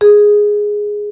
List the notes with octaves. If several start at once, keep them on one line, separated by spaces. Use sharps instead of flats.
G#4